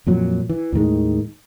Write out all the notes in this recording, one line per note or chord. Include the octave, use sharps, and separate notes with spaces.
F2 A#2 F#3
E3
D#2 A2 D#3 G#3